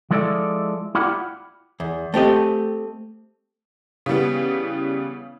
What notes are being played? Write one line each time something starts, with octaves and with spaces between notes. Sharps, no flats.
F3 G#3 E4 A4 D5 E5
E4 F4 G4 D5 F#5 B5
E2
A3 C4 G4 D#5
C#3 E3 G3 B3